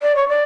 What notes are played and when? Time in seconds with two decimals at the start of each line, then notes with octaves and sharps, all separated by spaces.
0.02 D5
0.15 C#5
0.28 D5